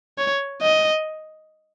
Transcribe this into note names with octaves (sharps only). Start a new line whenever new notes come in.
C#5
D#5